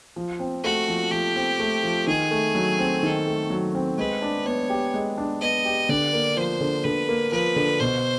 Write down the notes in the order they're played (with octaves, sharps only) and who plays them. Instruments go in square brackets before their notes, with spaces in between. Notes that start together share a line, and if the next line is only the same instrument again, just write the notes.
[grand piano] F3
C4
[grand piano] A3 [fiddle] F#4
[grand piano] F3
[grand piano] F3 [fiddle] G4
[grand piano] C4
A3
F3
[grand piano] D#3 [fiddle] G#4
[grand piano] A3
F#3
C4
[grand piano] D#3 [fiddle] A4
[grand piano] A3
F#3
C4
[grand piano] G#3 [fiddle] B4
[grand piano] D4
[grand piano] B3 [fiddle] C#5
[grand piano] G4
G#3
D4
[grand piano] B3 [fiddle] D#5
[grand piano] G4
[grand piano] D3 [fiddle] D5
[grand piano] A#3
[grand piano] F3 [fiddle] C5
[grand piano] D3
[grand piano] D3 [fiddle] B4
[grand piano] A#3
[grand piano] F3 [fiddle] B4
[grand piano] D3
[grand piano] B2 [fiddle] C5